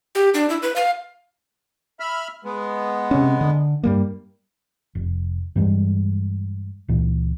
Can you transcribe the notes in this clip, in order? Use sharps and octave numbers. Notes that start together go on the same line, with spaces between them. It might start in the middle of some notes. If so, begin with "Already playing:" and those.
G4
D4
E4
B4
F5
E5 B5 F6
G#3 B3
C3 C#4
D3
G2 G3 A#3
F1
G2 E3 G3 G#3
C#2 A#2 E3